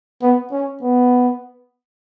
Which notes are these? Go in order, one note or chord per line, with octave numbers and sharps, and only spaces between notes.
B3
C#4
B3